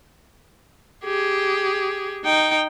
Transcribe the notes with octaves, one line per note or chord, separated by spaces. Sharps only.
G4 G#4
D#4 G5